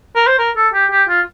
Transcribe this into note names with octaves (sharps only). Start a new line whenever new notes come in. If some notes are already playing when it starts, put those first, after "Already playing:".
A#4
C5
A#4
A4
G4
G4
F4